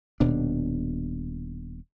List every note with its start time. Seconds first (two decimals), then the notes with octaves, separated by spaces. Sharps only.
0.20 D#1 B2 D4